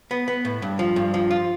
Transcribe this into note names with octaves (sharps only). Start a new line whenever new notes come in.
B3
B3
A2
G2
F3
G2
F3
F4